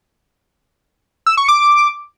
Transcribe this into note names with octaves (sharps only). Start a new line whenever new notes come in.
E6
C#6
D6